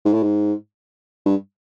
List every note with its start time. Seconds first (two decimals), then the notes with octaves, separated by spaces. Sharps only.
0.05 G#2
0.14 A2
0.23 G#2
1.26 G2